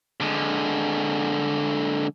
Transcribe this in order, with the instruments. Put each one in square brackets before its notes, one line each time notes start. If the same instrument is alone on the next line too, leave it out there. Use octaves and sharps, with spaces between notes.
[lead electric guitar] D3 G#3